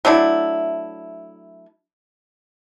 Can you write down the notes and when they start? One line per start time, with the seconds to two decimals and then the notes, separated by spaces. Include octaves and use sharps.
0.05 F#3 A3 D4 E4